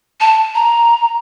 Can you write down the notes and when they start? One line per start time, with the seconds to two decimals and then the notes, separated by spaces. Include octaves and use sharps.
0.20 A5
0.55 A#5